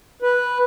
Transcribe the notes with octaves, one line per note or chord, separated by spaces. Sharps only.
B4